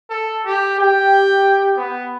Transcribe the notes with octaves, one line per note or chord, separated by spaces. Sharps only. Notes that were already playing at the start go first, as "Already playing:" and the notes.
A4
G4
G4 G5
B3